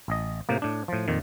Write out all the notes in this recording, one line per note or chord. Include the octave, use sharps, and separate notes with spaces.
A1 D#5
A2 C3 A#3
A2 D4
A2 F3
F2 A#2 D#3